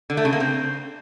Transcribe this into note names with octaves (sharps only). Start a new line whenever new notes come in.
D3
A3
C#3
A#3
C4